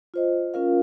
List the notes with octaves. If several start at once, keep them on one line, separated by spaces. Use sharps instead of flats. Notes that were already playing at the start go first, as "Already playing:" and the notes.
F4 C5 D#5
C#4 F4 A#4 F5